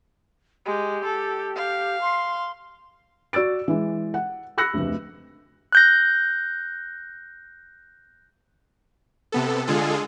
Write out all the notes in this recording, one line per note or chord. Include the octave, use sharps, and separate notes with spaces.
G#3 G4
A4
F5
C6
F#4 D5 E6 A6 D7
E3 G#3
F#5
B5 E6 F#6 A#6 C#7
F1 D2
F#6 G6 A#6
C3 B3 A4
D3 G#3 F4 G#4 A4